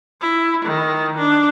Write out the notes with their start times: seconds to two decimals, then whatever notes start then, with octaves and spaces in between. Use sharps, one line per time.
0.21 E4
0.65 D#3
1.18 D4